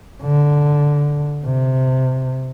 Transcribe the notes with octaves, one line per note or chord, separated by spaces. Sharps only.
D3
C3